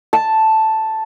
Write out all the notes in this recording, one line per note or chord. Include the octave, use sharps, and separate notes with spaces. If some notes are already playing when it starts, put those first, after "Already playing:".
A5